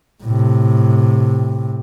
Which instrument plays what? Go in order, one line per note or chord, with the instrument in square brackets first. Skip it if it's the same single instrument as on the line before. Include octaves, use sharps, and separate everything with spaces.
[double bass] A2 C3